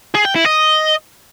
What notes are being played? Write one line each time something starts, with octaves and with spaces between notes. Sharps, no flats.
G#4
G5
E4
D#5